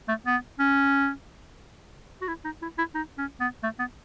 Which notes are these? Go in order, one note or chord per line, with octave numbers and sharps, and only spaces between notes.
A3
B3
C#4
F#4
E4
D#4
E4
E4
D#4
C#4
B3
A3
B3